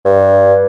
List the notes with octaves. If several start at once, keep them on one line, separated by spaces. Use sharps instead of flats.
G2